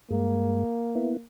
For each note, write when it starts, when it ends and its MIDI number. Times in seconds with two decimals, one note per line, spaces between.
0.10 0.64 43
0.10 0.64 56
0.10 1.25 58
0.95 1.17 59
0.95 1.17 64